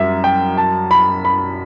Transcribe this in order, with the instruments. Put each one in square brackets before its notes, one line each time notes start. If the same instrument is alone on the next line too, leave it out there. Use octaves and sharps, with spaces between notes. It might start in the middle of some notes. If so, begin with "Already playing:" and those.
Already playing: [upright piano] F#2 G3 [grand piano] E5
[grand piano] G5
A5
B5
B5